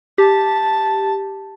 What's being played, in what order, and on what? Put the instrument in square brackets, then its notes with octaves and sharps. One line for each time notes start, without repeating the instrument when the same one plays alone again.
[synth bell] G4 [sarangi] A5